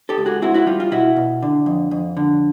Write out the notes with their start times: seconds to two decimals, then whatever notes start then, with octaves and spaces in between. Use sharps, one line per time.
0.09 G4 A4
0.18 C#2
0.26 F#4 G#4
0.42 C4 E4 F#4
0.54 E4 F#4
0.67 G3 F4
0.80 F4
0.91 B2 E4 F#4
1.16 B2
1.42 D3
1.66 F2
1.91 F2
2.17 D3